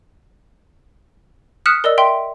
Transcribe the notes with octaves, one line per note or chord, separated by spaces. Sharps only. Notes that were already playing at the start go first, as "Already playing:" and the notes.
D#6 F6 F#6 B6 C#7 E7
A#4 D5 D#5 E6
E5 G5 C6